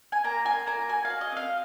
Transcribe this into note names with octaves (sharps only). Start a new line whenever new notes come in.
G#5
A#3 A#5
F4 G#5
A#3 A#5
F#4 G#5
F5
F#4
D#5
C4
F5